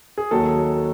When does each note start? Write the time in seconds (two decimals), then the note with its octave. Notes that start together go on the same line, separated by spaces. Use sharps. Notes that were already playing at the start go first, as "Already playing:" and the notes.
0.18 G#4
0.31 D#2 D#3 F#3 A4